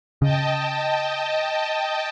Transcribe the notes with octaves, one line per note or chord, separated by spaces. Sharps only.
C#3 D#5 G5 A5